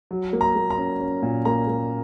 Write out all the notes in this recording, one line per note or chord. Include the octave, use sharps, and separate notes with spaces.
F#3
A#3
A#5
A#3
A#5
C#4
C#4
A#2
A#3 A#5
A#3